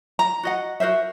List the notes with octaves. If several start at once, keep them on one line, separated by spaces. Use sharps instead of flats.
A#5
F#4 D#5 F#5
F#4 A#4 C5 E5